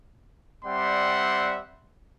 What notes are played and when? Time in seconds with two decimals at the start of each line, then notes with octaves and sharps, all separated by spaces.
0.65 G3 C4 D5 E5 F#5 C6